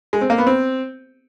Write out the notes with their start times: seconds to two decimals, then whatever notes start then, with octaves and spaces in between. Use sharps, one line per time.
0.13 G#3
0.21 C4
0.30 A#3
0.38 B3
0.47 C4